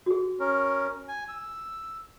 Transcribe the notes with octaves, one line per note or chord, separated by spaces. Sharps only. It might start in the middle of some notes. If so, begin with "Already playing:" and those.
F#4 G#4
C#4 A#4
G#5
E6